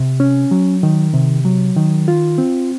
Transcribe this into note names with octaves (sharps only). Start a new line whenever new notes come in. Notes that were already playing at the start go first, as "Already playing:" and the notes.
Already playing: C3
C#4
F#3
D#3
C3
F#3
D#3
F4
C4